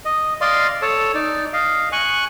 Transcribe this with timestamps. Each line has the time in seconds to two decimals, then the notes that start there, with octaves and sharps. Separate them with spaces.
0.05 D#5
0.41 D5 D#5 F5 C6
0.82 A4 C#5 A5
1.15 D#4 D5
1.53 D#5 F5
1.92 G#5 C#6 F#6